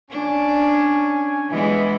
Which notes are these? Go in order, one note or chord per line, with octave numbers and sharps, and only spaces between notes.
C#4 D4 G#5
E3 G3 G#3 B3 E4 D#5